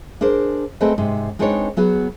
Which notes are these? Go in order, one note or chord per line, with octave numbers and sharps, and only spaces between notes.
D4 G#4 A#4 C5
A3 C4 G#4 B4 D#5
G#2 C3
G#3 C4 D4 D#4 B4 C#5
F#3 B3 G#4 B4